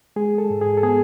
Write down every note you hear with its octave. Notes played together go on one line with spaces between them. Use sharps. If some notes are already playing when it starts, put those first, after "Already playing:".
G#3 G#4
A4
G#2
G#4
A4
B3 G#4